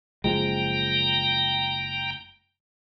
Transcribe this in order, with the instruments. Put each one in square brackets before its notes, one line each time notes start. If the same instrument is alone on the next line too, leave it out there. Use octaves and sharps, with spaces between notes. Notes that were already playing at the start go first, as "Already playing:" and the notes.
[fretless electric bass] F#1 F3 G#3 [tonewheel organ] G5 A#5